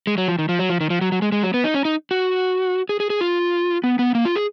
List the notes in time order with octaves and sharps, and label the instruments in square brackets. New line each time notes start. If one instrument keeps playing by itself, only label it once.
[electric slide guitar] G#3
F#3
F3
D#3
F3
F#3
F3
D#3
F3
F#3
F#3
G#3
G#3
F#3
B3
D#4
C#4
D#4
F#4
G#4
G#4
G#4
F4
B3
B3
A#3
F4
G#4